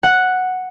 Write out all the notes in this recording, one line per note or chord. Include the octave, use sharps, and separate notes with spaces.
F#5